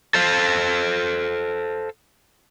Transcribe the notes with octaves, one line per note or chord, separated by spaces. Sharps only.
A4 C5 F5